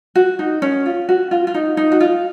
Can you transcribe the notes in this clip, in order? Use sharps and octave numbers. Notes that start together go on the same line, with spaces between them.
F#4
D#4
C#4
F4
F#4
F4
F4
D#4
D#4
F#4
F4